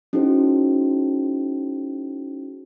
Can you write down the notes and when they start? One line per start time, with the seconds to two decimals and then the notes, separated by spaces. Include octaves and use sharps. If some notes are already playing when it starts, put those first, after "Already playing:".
0.13 C#4 D#4 E4 F#4 G#4 C5